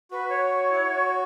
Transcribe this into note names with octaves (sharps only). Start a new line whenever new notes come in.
F#4 B4
C#5
E4
F#4